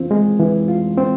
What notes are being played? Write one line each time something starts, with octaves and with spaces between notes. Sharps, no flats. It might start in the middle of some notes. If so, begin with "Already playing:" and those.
Already playing: E3 C4 F4
G#3
E3
F4
C4